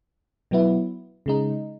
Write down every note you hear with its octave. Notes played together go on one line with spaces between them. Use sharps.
B2 F#3 B3 E4
C#3 G#3 D#4